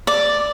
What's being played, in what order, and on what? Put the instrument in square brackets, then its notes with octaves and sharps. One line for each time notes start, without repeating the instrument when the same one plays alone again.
[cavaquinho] D5